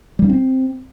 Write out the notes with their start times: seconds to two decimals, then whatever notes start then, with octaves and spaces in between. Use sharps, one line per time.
0.19 G3
0.24 D4
0.29 C4